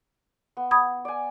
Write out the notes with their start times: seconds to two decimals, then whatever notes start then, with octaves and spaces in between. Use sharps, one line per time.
0.57 B3
0.71 B5 D#6 G#6
1.05 D5 G#5